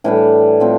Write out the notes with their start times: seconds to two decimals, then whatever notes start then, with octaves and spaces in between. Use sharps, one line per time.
0.04 A2 E3 G3 D4
0.60 A2 F3 A3 C4